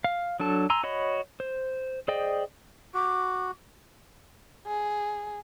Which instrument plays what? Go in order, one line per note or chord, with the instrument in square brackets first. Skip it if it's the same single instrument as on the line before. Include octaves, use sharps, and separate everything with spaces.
[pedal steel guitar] F5
F#3 D4 A4 A5
G#5 A#5 C6 E6
F#4 C#5 D#5 B5
C5
G#4 C5 D5 D#5 G5
[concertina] F#4 [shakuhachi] D6
[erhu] G#4